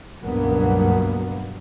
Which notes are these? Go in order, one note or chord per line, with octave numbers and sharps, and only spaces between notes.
C#2 G2 B2 F#3 A#3 B3